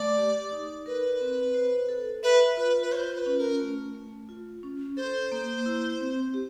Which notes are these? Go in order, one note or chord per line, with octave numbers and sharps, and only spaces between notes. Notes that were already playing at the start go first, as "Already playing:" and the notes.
Already playing: A3 D5
G4
D#4
A#4 B4
C4
C5
A4
B4 E5
F4 B4
B4
F4 C5 C#5
C5
B4
C#4
A#4
A3
A3
F4
C#4
A4 C5
A#3
E4
C4
G4